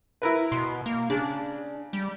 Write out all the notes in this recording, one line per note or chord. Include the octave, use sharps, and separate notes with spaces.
E4 A#4 B4
B2 C6
A#3
C#3 D4
G3